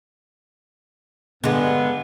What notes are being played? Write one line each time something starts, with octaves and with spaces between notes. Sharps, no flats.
G2 D3 G#3 B3